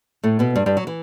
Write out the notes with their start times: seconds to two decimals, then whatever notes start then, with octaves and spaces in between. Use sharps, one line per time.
0.23 A2 A3
0.39 B2 B3
0.55 G2 G3
0.66 G2 G3
0.77 F#3
0.87 E3